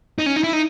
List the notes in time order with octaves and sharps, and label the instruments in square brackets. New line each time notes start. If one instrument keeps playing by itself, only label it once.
[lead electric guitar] D#4
C#4
D#4
E4
D#4